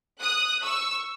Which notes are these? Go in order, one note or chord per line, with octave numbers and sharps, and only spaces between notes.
D#6 F#6
C#6 E6